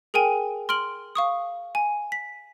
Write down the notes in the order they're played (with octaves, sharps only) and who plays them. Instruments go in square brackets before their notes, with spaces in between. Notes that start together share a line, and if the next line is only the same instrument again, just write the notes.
[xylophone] G#4 A#4 G5 G#5 D#7
C6 F6 D7 F#7
F5 C#6 D#6
G#5
B6